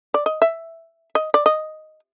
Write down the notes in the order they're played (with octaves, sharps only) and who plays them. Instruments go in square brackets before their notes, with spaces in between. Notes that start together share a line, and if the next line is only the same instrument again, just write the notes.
[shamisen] D5
D#5
E5
D#5
D5
D#5